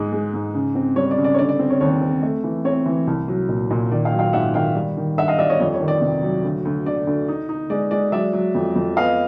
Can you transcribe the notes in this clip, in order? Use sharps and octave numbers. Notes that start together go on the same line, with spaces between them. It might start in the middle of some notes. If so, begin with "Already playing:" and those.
Already playing: G#2 G#3
G#3
G#2
C#3
C4
G3 C#5
D5
C#3
D5
C#5
D3 D5
D5
C4
C#5
D#2 C#5
C4
A3
E3
C4 C#5
E3
C2
F#3
A#2
A#2
D#3 D5
F5 G5
F#3
F5 G5
G#2 E5 F#5
D#3 F5 G5
G3
D#3
G2 E5 F#5
D#5 F5
G3 D5 E5
C#5 D#5
F2 C#5 D#5
C#5
D#3
D5
C3
F#3
D2
D2
D3 D5
D2
D#4
D#4
G#3 D5
G#3 D5
F#3 D5 E5
F#3
F2
F2
B3 D#5 F5